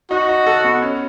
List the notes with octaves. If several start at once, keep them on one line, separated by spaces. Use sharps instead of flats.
D#4 F#4
D#4
A4
B3
C#4